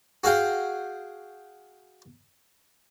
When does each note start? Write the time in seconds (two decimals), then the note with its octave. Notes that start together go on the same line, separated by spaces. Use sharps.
0.24 F#4 G#4 F5 G5